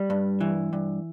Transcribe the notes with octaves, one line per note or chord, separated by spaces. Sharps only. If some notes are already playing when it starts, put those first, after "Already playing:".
Already playing: G3
G2
E3
G2